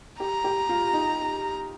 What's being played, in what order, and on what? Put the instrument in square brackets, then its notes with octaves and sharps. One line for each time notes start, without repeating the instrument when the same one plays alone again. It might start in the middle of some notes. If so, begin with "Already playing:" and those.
[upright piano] G4 [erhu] A#5
[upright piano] G4
F4
D#4